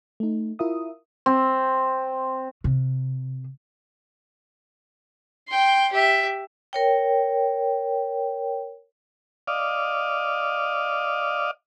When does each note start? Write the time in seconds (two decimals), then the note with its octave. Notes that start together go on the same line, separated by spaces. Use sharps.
0.20 A3 D#4
0.59 E4 F4 A#4 E5 D#6
1.26 C4
2.64 C3
5.48 G5 C6
5.92 G4 E5
6.73 A#4 C#5 G5
9.48 D5 D#5 F5